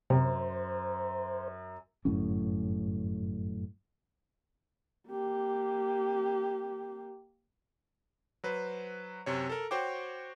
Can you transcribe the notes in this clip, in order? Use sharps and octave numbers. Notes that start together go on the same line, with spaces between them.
F#2 C3 C5
G1 F#2 A2 C#4
A#3 G4
F#3 B4 C5
F#2 C3 C#5
A4 A#4
F#4 C5 C#5 G5 D6